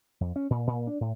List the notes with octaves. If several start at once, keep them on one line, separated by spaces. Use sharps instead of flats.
F2
C#4
A#2
A#2
D4
A2